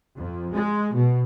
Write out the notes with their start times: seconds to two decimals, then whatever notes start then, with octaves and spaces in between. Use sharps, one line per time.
0.15 F2
0.52 G#3
0.93 B2